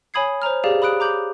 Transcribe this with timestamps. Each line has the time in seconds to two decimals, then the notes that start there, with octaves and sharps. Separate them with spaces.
0.14 C#5 G#5 B5 D#6 G#6 C7
0.42 C5 C#5 A#5 F6
0.64 G4 G#4 D5 F5
0.82 B5 D#6 F#6 D7
1.00 A#5 D6 G6 F#7